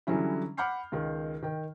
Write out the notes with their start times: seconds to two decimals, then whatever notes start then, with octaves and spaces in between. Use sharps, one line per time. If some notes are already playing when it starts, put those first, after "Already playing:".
0.07 D3 E3 F#3 G3 C#4 E4
0.57 F#5 B5 D6 F6 G6 C7
0.92 C#2 D#3
1.42 D#3 G5